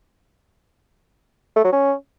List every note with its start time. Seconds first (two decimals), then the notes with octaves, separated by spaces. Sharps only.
1.56 A3
1.64 F#3
1.72 C#4